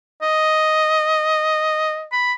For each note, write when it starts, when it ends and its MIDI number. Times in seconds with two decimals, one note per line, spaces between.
0.23 2.06 75
2.12 2.33 83